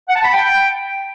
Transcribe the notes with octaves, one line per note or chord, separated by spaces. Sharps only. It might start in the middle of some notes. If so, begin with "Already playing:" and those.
F#5
A5
B5
G5